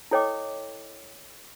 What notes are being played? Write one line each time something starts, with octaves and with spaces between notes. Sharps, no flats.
E4 A4 C#5 D#5 G5 D6